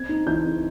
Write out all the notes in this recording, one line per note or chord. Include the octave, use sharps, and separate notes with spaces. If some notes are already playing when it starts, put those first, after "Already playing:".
Already playing: C4 G#6
D#4
E3 G6
C4